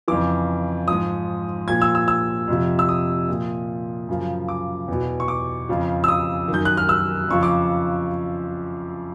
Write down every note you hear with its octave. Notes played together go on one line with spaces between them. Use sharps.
F2 C#3 E3 D6
G#2 F3 D#6
A#2 F3 G#6
E6
E6
E6
F2 C3 F3
E6
D#6
A#2 F3
F#2 C#3 F3
D6
E2 B2
C#6
D6
F2 C#3 F3
E6
D#6
D#3
F#2 G6
F#6
F6
E6
F2 C#3 F3 C#6
D6